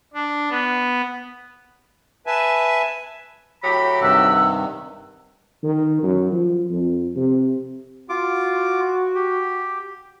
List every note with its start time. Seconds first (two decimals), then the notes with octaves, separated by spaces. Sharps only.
0.14 D4
0.50 B3
2.27 B4 E5 G#5 A5
3.63 A2 F#3 G4 B5
4.02 G2 C3 D#3 F#5 E6
5.63 D#3
6.03 F#2
6.32 F3
6.70 F2
7.16 C3
8.09 F4 F#4 D6
9.15 G4